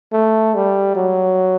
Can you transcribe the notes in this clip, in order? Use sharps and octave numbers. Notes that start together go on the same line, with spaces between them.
A3
G3
F#3